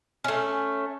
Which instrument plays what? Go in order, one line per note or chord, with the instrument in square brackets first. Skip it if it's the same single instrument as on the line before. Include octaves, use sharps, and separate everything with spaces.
[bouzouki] A3 C#4